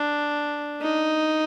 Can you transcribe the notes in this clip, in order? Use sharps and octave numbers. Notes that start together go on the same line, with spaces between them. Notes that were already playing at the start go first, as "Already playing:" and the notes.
Already playing: D4
D#4